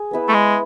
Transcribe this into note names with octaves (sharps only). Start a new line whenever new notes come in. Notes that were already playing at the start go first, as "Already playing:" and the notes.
Already playing: G#4
B3 E4 B4 E5
A3
G#3